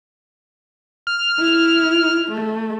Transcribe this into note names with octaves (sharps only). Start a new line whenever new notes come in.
F6
E4
A3